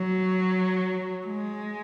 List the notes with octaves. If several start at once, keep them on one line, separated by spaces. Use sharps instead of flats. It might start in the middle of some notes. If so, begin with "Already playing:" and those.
Already playing: F#3
G#3